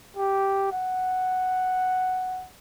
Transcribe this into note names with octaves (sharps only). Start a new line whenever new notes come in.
G4
F#5